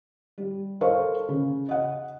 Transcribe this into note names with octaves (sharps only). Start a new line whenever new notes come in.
G3
A4 A#4 C5 F5 C#6
C#3
D#5 F#5